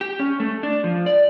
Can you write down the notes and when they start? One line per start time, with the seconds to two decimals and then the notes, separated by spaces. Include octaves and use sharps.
0.01 G4
0.20 C#4
0.40 A3
0.63 D4
0.84 F3
1.06 D5